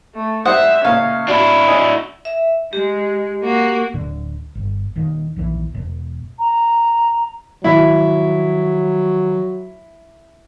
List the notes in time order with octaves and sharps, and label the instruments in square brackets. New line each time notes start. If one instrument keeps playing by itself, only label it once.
[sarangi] A3
[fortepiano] G3 C5 D#6 [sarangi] E5 [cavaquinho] F#5
[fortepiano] C#2 A#2 [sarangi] C#4 [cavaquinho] F5
[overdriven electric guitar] D4 E4 [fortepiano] F#4
[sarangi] F#4 [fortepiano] C#5 D#5 G#5
[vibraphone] E5
[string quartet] G#3 [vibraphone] G4
[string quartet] A#3 F#4
[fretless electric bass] D1 D3
G1
D#1 D#2 D#3
A#1 D#2 E3
E1
[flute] A#5
[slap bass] D#3 F3 G#3 [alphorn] F#3 [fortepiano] E4